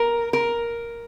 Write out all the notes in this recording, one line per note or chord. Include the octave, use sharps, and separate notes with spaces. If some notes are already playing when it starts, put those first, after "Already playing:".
Already playing: A#4
A#4